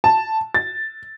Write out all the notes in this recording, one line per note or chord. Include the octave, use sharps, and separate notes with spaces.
A5
A6